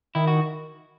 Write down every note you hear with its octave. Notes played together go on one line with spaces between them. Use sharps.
D#3 E4
F#4